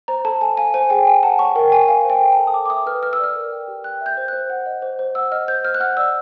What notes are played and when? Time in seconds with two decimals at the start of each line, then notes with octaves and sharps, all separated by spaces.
0.08 C5 A#5
0.25 A4 A5
0.41 A4 G#5
0.57 F5 G#5
0.74 C5 G#5
0.90 G#4 G5
1.07 G#4 G#5
1.23 F#5 A5
1.39 C#5 C#6
1.56 A#4 G5
1.72 A#4 G#5
1.88 F5 G#5
2.04 C5
2.10 G5
2.21 A4
2.32 A4 A5
2.47 D#6
2.54 G5 D6
2.66 D6
2.70 E5 D#6
2.86 B4 F6
3.03 B4 F6
3.13 E6
3.19 D5 F6
3.35 A#4
3.52 G5
3.68 G4
3.84 G5 F#6
4.01 E5
4.06 G6
4.17 C5
4.28 C5 F#6
4.50 F#5
4.66 D#5
4.82 C5
4.99 C5
5.15 F#5 E6
5.32 D#5 F6
5.48 C5 G6
5.64 C5 F6
5.74 F#6
5.80 F#5 F6
5.97 D5 E6